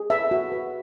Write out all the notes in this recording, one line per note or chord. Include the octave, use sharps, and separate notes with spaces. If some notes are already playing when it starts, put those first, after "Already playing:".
Already playing: G#4
B4 E5
F#4
B4